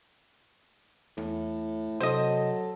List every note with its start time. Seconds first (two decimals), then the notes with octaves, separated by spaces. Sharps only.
1.17 E2 A2
2.00 C3 F#3 A4 C5 D#5